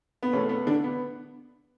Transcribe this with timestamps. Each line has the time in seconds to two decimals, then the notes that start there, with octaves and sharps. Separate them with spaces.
0.23 B3
0.33 E2 B2 A3 C#4
0.49 B3
0.67 D3 D4
0.84 B3